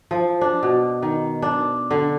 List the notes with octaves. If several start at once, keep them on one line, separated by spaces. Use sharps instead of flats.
F3
D4
B2
D#3
D4
D3